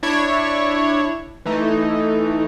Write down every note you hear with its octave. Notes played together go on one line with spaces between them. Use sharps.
D4 E4 C#5
E3 A3 D#4